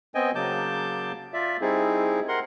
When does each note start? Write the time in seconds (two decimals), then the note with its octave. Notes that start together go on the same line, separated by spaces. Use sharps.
0.15 B3 C4 D#5 G5 G#5
0.35 C#3 F#3 A#3 A5 D6 G6
1.33 F4 D5 E5
1.61 G3 C4 D#4 E4 G#4
2.28 A#4 F#5 C6